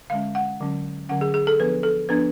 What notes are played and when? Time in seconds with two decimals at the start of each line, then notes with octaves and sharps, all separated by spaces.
0.10 D3 G#3 C#4 F5
0.35 F#5
0.60 D3 F#3 C#4
1.09 D3 F#3 C#4 F#5
1.21 G#4
1.34 G#4
1.47 A4
1.60 F3 B3 D4 B4
1.83 A4
2.09 F3 B3 D4 B4